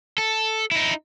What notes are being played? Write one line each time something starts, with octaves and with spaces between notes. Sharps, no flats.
A4
D#4 E4